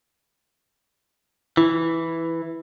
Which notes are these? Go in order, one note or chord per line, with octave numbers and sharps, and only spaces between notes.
E3 E4